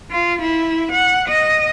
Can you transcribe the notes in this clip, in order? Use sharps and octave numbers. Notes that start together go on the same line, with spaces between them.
F4
E4
F#5
D#5